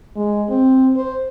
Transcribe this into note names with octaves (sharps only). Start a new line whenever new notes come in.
G#3
C4
C5